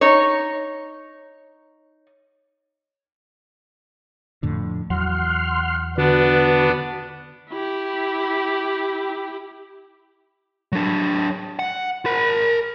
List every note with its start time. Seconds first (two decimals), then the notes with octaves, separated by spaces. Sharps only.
0.01 D#4 C#5
4.43 F2 A2 D3
4.90 E2 F#3 F#5 C6 F6
5.98 D3 B3 D4 F#4 B4
7.50 E4 G4
10.72 F#3 D4
11.59 F#5
12.06 A#4 B5